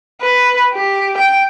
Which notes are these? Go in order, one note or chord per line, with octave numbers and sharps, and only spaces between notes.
B4
G4
G5